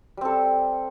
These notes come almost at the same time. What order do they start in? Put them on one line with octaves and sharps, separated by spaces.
G3 C4 A4